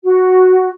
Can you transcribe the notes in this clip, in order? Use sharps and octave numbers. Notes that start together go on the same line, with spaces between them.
F#4